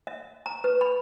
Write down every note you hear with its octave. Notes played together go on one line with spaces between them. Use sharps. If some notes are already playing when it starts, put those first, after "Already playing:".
E5
A#5
B4
B5